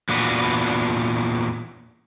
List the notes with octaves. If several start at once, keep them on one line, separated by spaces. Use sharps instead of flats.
E2 A#2 D4 F#4 B4